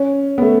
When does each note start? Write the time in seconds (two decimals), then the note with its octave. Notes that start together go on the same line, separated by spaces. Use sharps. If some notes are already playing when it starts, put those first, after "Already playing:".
Already playing: C#4
0.38 B3
0.42 A3